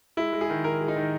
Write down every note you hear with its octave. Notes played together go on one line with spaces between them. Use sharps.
G#3 E4
G#3
G#4
D#3
D#3 A#4
G#3
D#4
D#3